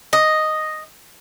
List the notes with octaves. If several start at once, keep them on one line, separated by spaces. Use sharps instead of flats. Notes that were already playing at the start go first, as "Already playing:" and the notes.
D#5